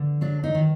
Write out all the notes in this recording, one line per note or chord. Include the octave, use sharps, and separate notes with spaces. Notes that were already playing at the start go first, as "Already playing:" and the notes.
Already playing: D3
F#3 D4
D#4
D#3